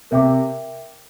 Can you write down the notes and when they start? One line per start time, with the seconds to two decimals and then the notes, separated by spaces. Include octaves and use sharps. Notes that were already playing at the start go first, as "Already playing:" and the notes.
0.11 C3 A#4 E5 G5 D6